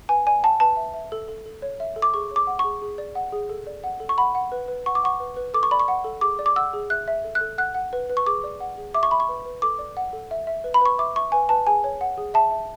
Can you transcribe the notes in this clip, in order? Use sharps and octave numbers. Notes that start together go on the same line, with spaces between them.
B4 G#5
D5 G#5
F#5 A5
B4 A5
E5
E5
A4
A4
A4
C#5
E5
A4
D6
G#4 C#6
C#5
D6
F#5
G#4 C#6
G#4
D5
F#5
G#4
A4
D5
F#5
A4
C#6
F#5 B5
F#5
B4
B4
F#5 C#6
D6
F#5 C#6
B4
B4
A4 D6
C#6
D5 B5
C#6
F#5
A4
G#4 D6
D5
D6
F#5 E6
G#4
E5 F#6
E5
A4
F#6
A4
F#5 F#6
F#5
B4
B4
C#6
G#4 D6
D5
F#5
G#4
E5 D6
C#6
E5 B5
C#6
B4
B4
A4 D6
D5
F#5
A4
E5
E5
B4
B5
B4 C#6
E5 D6
E5 C#6
B4 G#5
B4 A5
G#4 G#5
C#5
F#5
G#4
E5 A5
E5